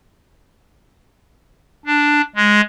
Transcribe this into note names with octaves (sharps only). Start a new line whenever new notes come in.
D4
G#3